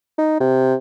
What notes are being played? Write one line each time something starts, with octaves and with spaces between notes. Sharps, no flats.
D#4
C3